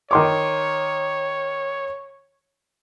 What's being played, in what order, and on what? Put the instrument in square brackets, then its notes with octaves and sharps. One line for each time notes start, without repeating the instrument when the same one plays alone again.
[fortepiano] D#3 C6 D6 [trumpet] C#5